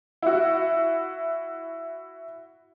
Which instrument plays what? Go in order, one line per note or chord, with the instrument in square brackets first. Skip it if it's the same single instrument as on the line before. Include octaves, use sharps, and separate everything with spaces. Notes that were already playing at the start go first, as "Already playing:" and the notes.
[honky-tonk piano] E4 F#4